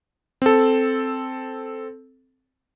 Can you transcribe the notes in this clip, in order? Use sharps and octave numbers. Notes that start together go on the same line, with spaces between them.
C4 A4